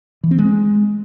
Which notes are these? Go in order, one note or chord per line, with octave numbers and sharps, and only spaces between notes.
E3
C4
G#3